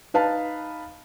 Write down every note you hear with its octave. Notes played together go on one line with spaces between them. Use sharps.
D#4 B4 F5 A5